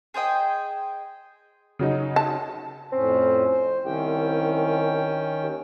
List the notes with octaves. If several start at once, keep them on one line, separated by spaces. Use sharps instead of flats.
G#4 C5 D#5 G5
C#3 F#3 D#4
A5
F2 A2 C4 C#4
C5
C2 D#3 C#4 G5
D#2